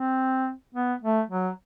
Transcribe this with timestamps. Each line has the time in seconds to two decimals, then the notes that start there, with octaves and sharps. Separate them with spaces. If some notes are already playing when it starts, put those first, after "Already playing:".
Already playing: C4
0.75 B3
1.02 A3
1.30 F#3